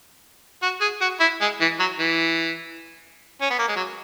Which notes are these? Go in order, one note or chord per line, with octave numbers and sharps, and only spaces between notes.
F#4
G#4
F#4
E4
G#3
E3
F#3
E3
C#4
B3
A#3
G#3
F#3